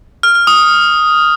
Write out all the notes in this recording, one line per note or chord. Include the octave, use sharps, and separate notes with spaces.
F6
F6
D#6